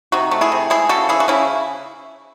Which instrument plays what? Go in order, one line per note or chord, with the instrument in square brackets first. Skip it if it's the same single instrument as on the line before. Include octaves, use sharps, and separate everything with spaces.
[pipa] C3 D#4 F#4
A3
E4 G#4
C3
G#3 E4 G#4
C#3 F#4 A4
E3 E4 G#4
F#4
C#3 C#4 E4